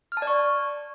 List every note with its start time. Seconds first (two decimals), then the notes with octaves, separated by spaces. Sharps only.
0.12 F6
0.17 A5
0.22 D5
0.27 C#6